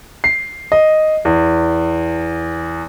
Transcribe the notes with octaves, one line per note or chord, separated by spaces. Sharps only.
C7
D#5
E2